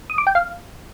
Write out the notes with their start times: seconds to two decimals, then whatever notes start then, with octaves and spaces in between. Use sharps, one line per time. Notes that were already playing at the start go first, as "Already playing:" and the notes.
0.10 D#6
0.18 D6
0.27 G5
0.35 F5